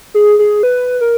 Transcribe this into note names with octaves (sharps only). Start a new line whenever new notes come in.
G#4
G#4
B4
A#4